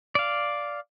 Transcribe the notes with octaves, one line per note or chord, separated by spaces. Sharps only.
D5 F5